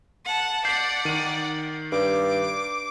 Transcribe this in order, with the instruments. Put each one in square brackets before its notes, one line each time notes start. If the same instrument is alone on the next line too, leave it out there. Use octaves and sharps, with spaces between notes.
[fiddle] F#5 A5
[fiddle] D5 F#5 [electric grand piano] G6 B6 [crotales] C7
[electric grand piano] D#3 D#7
[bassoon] G2 [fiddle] D6